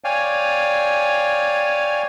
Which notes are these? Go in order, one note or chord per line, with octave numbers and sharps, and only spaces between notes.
C#5 D5 F5 G5 G#5